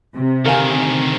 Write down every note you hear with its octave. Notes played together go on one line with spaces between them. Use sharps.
C3
D2 D#3 A#4 F5 G#5